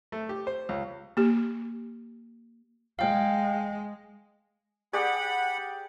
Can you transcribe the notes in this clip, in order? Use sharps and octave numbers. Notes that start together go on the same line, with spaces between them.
A3
G4
C5
C#2
A#3 G4
G#3 F5 G5
G4 G#4 D5 F#5 B5